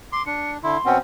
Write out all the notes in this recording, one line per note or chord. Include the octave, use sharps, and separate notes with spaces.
C6 D6
D4 C#7
D3 E4 C6
B2 C4 C#4 F#5